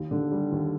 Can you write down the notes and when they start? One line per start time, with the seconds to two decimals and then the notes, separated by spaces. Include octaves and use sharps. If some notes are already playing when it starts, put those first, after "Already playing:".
Already playing: D#2
0.11 D3
0.32 G3
0.52 D#2